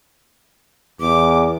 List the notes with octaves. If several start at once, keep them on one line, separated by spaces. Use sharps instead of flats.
E2 D6